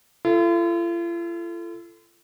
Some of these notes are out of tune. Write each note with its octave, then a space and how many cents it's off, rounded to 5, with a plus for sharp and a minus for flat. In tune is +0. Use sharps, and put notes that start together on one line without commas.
F4 -45 A4 +0